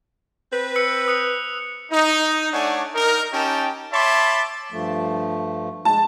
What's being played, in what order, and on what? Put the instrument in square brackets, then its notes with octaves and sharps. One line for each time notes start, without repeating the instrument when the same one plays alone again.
[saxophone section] C4 B4
[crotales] E6 C#7
D#6 F#6 C#7
[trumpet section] D#4
A3 D4 C#5 D5 F#5 G#5
D#4 A#4
C#4 D#4 G4 G5 A5
C#5 E5 A5 B5 C6 D6
[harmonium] G2 F3 A3
[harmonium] G#3 [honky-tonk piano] A5